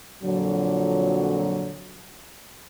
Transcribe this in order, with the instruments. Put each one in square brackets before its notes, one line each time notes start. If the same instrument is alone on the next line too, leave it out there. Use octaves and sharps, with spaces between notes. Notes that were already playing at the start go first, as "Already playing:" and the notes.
[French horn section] F2 A#2 D3 F#3